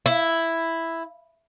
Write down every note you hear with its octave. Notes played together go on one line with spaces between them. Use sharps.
E4